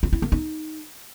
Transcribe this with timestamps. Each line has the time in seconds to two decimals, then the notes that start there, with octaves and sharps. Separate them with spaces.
0.03 F4
0.13 E4
0.22 A#3
0.32 D#4